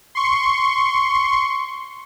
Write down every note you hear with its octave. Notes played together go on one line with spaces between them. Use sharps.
C6 C#6